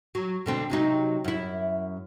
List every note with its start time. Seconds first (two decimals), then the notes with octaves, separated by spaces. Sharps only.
0.15 F#3
0.46 B2 D3 C4
0.70 C3 F#3 D#4
1.24 F#2 E4